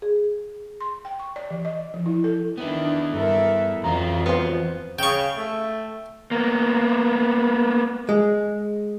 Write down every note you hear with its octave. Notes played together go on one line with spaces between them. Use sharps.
G#4
C6
G5
C#6
D5
E3
D#5
F3
E4
A4
D#3 B3 D4 E4
G2 A4 A#4 E5
F2 E3 F#3 F4 A#5
B3 C5
C#3 G5 C#6
A3
A#3 B3
G#3